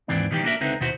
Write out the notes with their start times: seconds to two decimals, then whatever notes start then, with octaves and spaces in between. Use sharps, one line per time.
0.08 D#2 G#2 E3 C4 D4
0.31 B2 D#3 E3 G3 G4
0.43 A#3 B3 D4 F#4 A#4 E5
0.61 C#2 D3 C4 D#4 B4 E5
0.80 D#2 B2 E4 F#4 C5